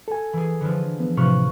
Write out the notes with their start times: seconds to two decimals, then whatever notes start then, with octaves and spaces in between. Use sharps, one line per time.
0.08 A4 G#5
0.33 E3 G#4
0.61 D3 E3 F3
1.00 B3
1.17 A2 C3 F3 F4 B4 C#6